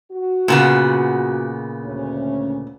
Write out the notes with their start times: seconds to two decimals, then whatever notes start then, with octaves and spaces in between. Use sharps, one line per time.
0.12 F#4
0.48 A#2 C#3 B3
1.85 D2 C#4